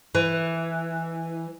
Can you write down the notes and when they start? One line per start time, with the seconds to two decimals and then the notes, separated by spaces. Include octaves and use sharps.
0.15 E3